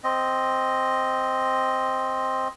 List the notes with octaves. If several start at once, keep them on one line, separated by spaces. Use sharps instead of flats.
C4 D#5